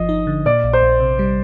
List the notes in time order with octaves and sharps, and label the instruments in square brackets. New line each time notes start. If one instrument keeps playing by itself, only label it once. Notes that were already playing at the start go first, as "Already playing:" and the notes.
Already playing: [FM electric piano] G1 F3 [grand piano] D#5
[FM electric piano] D#4
D3
[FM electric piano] A#2 [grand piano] D5
[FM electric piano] A#1
[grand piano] C5
[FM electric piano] A#1
C3
G3